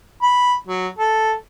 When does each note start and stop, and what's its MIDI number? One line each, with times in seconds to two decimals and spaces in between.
0.22 0.55 83
0.67 0.88 54
0.98 1.33 69